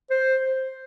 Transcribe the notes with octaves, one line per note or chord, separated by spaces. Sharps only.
C5